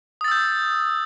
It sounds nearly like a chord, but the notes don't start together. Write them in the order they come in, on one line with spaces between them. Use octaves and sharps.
D#6 A6 E6 G6